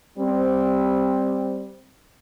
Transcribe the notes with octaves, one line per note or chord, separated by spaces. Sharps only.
G3 C4